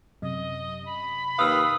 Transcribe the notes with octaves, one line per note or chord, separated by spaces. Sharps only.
F#2 C3 D#5
B5
D#2 B4 F5 D#6 E6